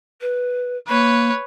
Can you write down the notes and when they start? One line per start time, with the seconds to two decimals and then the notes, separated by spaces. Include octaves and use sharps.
0.21 B4
0.88 A#3 B4 C#5